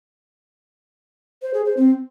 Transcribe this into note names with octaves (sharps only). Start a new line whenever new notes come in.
C5
G#4
C5
C4